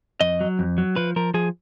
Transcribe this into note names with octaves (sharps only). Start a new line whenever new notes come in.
F2 D#5
F#3
F2
F#3
F3 B4
F3 A#4
F3 G#4